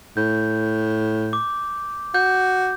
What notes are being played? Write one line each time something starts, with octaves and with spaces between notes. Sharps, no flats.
A2 G6
D6
F#4 G6